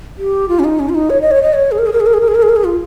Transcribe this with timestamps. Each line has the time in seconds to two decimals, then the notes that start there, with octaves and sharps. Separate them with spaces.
0.18 G4
0.49 F4
0.59 C#4
0.64 D#4
0.80 C#4
0.89 F4
0.95 D#4
1.10 C#5
1.22 D#5
1.31 C#5
1.42 D#5
1.53 C#5
1.72 G#4
1.78 A#4
1.86 G#4
1.92 A#4
2.00 G#4
2.06 A#4
2.14 G#4
2.21 A#4
2.28 G#4
2.35 A#4
2.42 G#4
2.49 A#4
2.56 G#4
2.64 F4